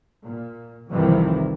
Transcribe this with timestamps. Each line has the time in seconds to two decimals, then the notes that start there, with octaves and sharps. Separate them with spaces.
0.22 A#2
0.90 C2 F2 C3 D#3 E3